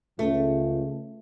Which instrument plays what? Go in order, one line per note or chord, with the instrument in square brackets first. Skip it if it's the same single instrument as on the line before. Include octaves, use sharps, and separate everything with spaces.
[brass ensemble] C#2 [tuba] C#3 [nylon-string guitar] A3